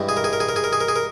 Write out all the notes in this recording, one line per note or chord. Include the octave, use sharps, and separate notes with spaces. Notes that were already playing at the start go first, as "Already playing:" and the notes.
Already playing: G2 E3 G#3
G#4
A#4
G#4
A#4
G#4
A#4
G#4
A#4
G#4
A#4
G#4
A#4